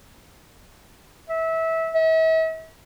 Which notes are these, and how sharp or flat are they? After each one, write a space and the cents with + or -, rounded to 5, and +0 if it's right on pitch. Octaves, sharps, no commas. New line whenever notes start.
E5 -20
E5 -40